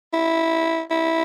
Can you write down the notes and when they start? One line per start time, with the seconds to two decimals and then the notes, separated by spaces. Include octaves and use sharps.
0.13 E4
0.91 E4